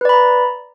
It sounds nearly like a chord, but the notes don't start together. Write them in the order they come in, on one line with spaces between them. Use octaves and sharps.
B4 D5 B5 A#5